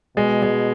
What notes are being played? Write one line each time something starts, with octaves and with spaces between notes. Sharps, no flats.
B2 G#3
G#3